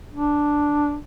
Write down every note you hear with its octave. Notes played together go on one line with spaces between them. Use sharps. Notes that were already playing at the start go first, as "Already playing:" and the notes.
D4